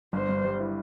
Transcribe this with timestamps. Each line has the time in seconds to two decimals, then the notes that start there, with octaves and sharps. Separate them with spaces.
0.13 G1 C5
0.29 G2
0.44 G3
0.60 E4